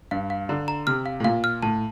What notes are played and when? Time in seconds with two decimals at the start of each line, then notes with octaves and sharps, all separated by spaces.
0.11 G2 F5
0.30 F5
0.49 D3 A#5
0.68 A#5
0.87 C3 F6
1.06 F5
1.20 A2
1.24 A#2 F5
1.44 F6
1.62 A2 A5